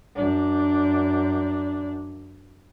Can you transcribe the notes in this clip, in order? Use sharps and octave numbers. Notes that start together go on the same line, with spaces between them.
F#2 D4